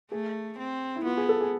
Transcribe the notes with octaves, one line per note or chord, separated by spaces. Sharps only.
A3 G#4
C4
E4
B3 F4
G#4
A4
G#4